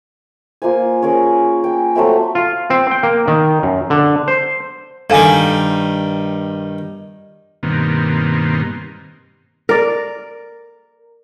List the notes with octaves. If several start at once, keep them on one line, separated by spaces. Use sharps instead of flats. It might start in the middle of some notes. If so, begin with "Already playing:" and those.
A#3 F4 C5 G#5
C#4 G#4 A#4 C#5
G5
F#3 A3 C4 E5
F4
C4
G5
A#3
D#3
F#2
D3
C5
G2 D#3 A4 F5 G#5
G2 B2 D#3 A#3 C4
A#4 D5